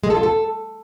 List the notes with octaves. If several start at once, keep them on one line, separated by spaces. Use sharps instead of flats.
G#3
A4
F4
A4